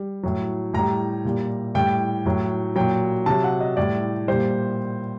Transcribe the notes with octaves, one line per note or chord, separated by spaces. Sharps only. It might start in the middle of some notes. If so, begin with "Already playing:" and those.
Already playing: G3
A2 F#3
A2 G3 A#5
A#2 G3
A2 G3 G5
A2 F#3
A#2 F#3 G5
C3 F#3 A5
F#5
D#5
A2 G3 D5
A#2 G3 C5